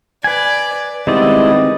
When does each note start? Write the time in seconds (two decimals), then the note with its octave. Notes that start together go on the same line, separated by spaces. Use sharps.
0.24 B4 D5 G#5
1.07 D#3 G3 G#3 B3 C4 E4 D5 D#5